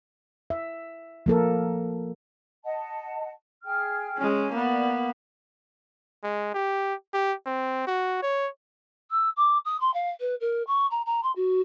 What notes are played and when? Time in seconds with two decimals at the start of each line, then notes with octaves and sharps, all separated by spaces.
0.50 E5
1.26 F3 A#3 A4 A#4
2.64 D#5 F#5 A5
3.64 G#4 G5 F6
4.18 G#3 C#4
4.51 A#3 B3 D5
6.23 G#3
6.54 G4
7.14 G4
7.46 C4
7.87 F#4
8.23 C#5
9.11 E6
9.37 D6
9.65 D#6
9.81 C6
9.94 F5
10.20 B4
10.41 A#4
10.67 C#6
10.91 A#5
11.06 A#5
11.23 C6
11.36 F#4